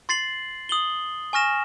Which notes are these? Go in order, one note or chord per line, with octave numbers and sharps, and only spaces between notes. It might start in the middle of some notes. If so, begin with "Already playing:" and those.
C6 A6 C7 F#7
D#6 F#7 G7
G#5 C#6 F6 A#6 E7